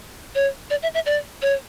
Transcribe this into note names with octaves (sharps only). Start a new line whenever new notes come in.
C#5
D5
E5
E5
D5
C#5